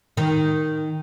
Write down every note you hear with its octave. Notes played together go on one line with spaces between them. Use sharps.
D#3